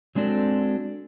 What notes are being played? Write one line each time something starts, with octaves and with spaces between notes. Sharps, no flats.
F#3 G#3 C4 D4 F#4 A4